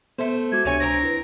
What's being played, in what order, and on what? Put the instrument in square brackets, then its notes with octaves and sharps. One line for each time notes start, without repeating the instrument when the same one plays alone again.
[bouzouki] A3 C5 [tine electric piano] B3 A4 E5
[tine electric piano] G#3 F#4 D6 [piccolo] G#6
[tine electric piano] C#2 D4 [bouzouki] C3 C#5 G#5
[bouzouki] C4 A#4 A#5 [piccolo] A#6
[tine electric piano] E4 B4